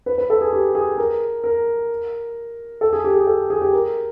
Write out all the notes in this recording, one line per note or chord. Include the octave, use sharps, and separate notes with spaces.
B4
B4
A4
G#4
G4
G#4
A#4
A#4
A4
G#4
G4
G#4
A4
G#4
G4
A#4